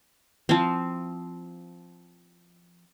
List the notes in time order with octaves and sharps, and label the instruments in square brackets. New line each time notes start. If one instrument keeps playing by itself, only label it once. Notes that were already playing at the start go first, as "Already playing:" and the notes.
[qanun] F3 C4